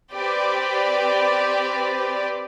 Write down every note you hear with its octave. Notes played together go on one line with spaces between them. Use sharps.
C4 G4 B4 D5